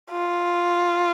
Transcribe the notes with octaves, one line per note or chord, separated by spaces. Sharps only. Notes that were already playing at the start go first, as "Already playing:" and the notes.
F4